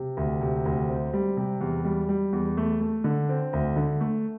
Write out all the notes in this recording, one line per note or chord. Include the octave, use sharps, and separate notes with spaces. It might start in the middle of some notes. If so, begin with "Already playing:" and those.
Already playing: C3
D2
C3
D2
C4
G3
C3
E2
G3
G3
E2
A3
A3
D3
C4
D2
D3
A3